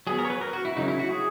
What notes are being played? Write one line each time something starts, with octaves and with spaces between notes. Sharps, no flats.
F#3 B3 G#4
A#4
C#5
B4
A#4
F#4
E4
C#3 F#3 A#3 C#4 D#4
E4
F#4
G#4